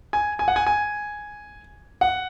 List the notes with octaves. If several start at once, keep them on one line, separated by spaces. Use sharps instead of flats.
G#5
G#5
F#5
G#5
G#5
F#5